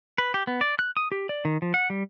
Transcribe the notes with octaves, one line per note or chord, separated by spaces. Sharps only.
B4
G4
B3
D5
F#6
D#6
G4
D5
D#3
F3
F#5
G3